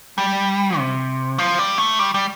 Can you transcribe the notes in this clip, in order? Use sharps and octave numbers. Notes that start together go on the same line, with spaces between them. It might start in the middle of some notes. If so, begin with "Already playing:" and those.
G3
C3
F3
G3
A3
G3
G3